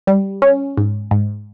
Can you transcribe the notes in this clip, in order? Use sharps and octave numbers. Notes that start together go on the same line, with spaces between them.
G3
C#4
G#2
G#2